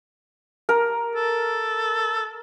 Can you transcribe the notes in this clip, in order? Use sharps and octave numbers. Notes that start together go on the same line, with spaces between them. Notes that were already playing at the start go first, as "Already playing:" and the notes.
A#4
A4